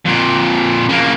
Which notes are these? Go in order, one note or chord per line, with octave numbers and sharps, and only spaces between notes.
F2 A#2
C#3 A#3